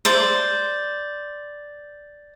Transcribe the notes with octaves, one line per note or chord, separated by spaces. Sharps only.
C5 D5